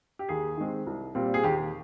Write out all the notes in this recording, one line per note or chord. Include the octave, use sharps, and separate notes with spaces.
G4
D#2 G#4
D#3 G#3 C4
C2
A#2 G3 C4
G#4
D#2 G4